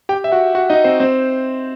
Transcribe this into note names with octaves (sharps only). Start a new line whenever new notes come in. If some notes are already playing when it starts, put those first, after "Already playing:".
G4 G5
E5
F#4 F#5
F#4 F#5
D#4 D#5
C4 C5
C4 C5